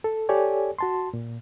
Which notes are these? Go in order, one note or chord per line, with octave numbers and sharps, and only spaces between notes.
A4
G4 A4 C#5 D5 G#5
F#4 A5 C6
A#2